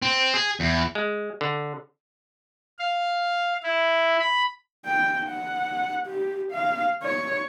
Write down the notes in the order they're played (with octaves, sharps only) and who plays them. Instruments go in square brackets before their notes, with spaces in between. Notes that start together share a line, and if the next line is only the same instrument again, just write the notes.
[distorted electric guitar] C4
G#4
E2
[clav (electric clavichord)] G#3
D3
[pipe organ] F5
E4
B5
[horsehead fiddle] G5
F#5
G4
F5
C#5